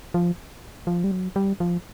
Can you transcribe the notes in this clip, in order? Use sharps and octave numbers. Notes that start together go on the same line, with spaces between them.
F3
F3
G3
F#3
G3
F3